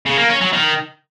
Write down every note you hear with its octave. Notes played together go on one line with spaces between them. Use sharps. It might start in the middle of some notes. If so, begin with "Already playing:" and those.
C#3
A#3
C#4
F#3
D#3